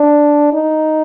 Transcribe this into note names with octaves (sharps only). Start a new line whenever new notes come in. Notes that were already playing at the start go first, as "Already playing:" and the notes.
Already playing: D4
D#4